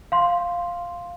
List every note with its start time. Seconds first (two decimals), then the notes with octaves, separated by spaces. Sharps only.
0.12 F5 C6